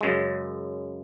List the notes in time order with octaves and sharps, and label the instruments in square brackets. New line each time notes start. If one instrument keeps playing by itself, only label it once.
[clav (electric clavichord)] F#2 C#3 G#3